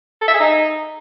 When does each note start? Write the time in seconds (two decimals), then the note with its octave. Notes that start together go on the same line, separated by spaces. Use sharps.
0.22 A4
0.28 E5
0.34 G#4
0.40 D#4